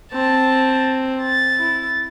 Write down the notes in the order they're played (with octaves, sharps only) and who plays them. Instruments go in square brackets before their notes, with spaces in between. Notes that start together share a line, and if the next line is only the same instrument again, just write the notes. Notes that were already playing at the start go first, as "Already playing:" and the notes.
[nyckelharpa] C4 [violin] A5
[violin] A6
[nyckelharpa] E4